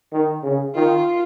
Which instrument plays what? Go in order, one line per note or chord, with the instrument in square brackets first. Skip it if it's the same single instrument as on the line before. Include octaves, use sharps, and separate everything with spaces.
[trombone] D#3
C#3
[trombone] D#3 [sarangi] F4